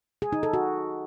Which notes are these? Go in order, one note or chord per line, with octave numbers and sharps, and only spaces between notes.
G#4
D#4
A4
F#4